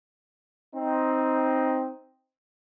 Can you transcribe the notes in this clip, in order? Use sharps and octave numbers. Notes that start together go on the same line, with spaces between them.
C4 D#4